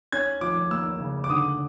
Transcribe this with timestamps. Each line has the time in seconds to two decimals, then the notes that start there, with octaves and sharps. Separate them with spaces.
0.12 C#4 G#6
0.41 F3 D6
0.71 A#3 E6
1.00 C#3
1.24 D6
1.30 D3 D#6